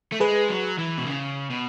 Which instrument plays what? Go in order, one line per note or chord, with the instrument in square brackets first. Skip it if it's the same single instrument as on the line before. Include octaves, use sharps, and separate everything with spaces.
[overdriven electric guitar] A3
[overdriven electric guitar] G#3 [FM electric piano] G#4 B4
[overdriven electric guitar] F#3
E3
B2
C#3
B2